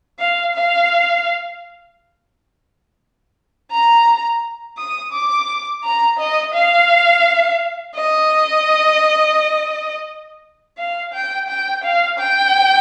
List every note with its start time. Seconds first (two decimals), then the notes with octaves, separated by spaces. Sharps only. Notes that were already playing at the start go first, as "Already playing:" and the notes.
0.19 F5
0.55 F5
3.72 A#5
4.78 D#6
5.13 D6
5.84 A#5
6.19 D#5
6.54 F5
7.96 D#5
10.78 F5
11.13 G5
11.48 G5
11.84 F5
12.19 G5